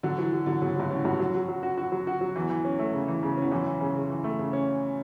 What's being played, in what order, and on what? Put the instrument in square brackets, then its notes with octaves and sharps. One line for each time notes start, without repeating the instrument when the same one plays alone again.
[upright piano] D3 [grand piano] F#3
[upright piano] E3 [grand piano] F#3
[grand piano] F#3
[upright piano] D3 [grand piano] F#3
[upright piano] C#3 [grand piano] F#3
[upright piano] G2 [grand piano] F#3
[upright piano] A2 [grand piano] C#4
[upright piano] G2 [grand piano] F#4
[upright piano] F#2 [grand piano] F#3
[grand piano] F#3
F#3
F#4
F#4
F#3
F#4
F#3
[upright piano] E2 [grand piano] E3
[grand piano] E3
C#4
A3
C#3
E3
C#3
[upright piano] E2 [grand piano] C#4
[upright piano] F#2 [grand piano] E3
[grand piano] E3
C#3
C#3
E3
A3
C#3
C#4